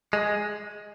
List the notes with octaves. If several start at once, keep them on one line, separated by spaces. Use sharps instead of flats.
G#3